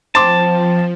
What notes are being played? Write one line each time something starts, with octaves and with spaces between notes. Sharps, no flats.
F3 C4 A5 C6 D6